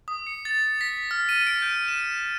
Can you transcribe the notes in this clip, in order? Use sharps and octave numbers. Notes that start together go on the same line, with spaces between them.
D#6
C#7
A6
B6
F6
D#7
D7
G6
E7